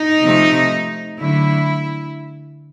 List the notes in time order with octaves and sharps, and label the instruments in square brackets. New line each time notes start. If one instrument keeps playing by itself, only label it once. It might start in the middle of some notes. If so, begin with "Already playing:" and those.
Already playing: [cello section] D#4
C3 F3 A3
D3 F#3 A3 E4